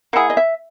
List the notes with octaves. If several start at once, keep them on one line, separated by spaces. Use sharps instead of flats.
A#3 E4 G#4 F#5
D#5
E5